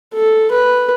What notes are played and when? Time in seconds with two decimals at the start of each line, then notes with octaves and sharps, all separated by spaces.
0.14 A4
0.51 B4